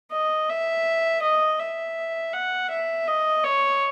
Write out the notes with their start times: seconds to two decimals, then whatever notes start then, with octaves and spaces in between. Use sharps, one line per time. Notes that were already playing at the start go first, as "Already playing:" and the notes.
0.12 D#5
0.49 E5
1.22 D#5
1.59 E5
2.33 F#5
2.71 E5
3.08 D#5
3.44 C#5